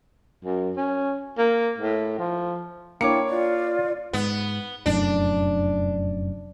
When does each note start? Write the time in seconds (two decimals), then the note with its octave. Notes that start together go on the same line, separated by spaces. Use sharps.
0.44 F#2
0.77 C#4
1.38 A#3
1.78 A2
2.18 F3
3.01 A#3 D4 E4 C#5 G5 D6 C#7
3.29 F4 D5
4.13 G#2 B3
4.86 F1 F#2 A2 D4